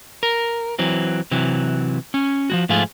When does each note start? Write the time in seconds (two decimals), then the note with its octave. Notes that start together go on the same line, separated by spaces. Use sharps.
0.23 A#4
0.79 E3 F#3 C4
1.31 C3 E3 F#3
2.14 C#4
2.50 F3 G#3 F#4
2.69 G#2 F3 A3 F4 G#4